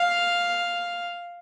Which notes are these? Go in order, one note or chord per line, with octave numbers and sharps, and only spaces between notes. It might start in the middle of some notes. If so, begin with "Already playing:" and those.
Already playing: F5